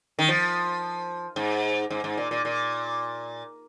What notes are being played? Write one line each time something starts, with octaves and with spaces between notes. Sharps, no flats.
D#3
F3
G#2
G#2
G#2
A#2
A#2
A#2